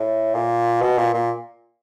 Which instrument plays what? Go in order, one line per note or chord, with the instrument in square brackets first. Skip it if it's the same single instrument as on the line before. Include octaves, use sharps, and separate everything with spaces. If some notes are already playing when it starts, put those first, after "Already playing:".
Already playing: [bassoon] A2
A#2
B2
A#2
A#2